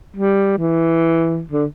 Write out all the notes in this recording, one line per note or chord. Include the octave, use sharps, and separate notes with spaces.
G3
E3
D3